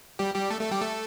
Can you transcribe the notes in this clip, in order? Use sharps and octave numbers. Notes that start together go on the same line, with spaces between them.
G3 G4
G3 G4
A3 A4
A3 A4
G3 G4
A3 A4